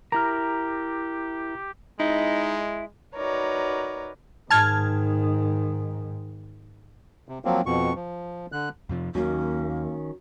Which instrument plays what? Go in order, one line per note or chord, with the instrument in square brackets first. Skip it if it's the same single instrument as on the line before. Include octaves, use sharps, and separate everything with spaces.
[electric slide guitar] E4 A#4 [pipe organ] G4 [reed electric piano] A#5 F6
[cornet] G#3 [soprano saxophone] D#4 [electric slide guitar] E4
[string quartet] D#4 F#4 A#4 B4 C#5 D5
[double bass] G#2 D#3 [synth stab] A5 F6 G#6
[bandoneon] C3
F3 F#3 A#3 C4
F2 B2 C#6
F3
D3 F#6
[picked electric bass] F2 C3 F3
[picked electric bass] D#2 [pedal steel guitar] D#3 C#4 [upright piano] F#3 [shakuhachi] A#3